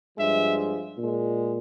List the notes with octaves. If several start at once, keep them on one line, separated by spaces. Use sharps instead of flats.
G2 F3 G#3 E5
A#2 G#3